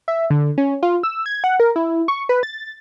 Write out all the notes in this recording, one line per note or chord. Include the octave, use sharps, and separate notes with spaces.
E5
D3
C#4
F4
E6
G#6
F#5
A#4
E4
C#6
B4
A6